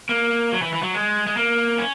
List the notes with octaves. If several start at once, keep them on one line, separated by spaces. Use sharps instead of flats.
A#3
F#3
E3
E3
F#3
G#3
G#3
A#3
C#4